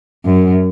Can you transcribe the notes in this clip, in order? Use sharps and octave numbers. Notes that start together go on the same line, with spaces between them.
F#2